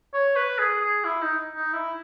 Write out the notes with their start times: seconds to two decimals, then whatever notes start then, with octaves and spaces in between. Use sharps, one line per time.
0.13 C#5
0.36 B4
0.59 G#4
0.81 G#4
1.05 E4
1.22 D#4
1.56 D#4
1.73 E4